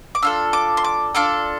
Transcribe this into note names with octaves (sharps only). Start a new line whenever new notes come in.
D6
D4 F4 A4 E6
D6
C6
D6
D4 F4 A4 D6